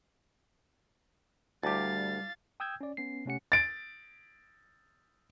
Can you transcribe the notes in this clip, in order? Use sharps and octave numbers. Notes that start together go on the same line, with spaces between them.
D2 G3 E4 G4 F5 A5 D6 A6
G5 D#6 E6 G6 G#6
C#4 D5
B3 C#4 C7
C3 A3 C#4 G4 F#5 C#7
A6 D7